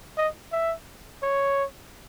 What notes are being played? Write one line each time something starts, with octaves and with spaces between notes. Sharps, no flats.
D#5
E5
C#5